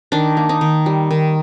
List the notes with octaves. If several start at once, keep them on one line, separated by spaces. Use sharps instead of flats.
D#3 D4
A#3
D#4
D#3
G3
D#3